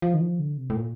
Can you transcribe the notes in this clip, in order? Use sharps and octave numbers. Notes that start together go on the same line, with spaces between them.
F3
D#3
F3
D3
C3
A2
A#2